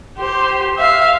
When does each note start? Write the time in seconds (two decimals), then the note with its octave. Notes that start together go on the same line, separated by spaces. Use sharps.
0.18 G4 C5
0.78 E5 F5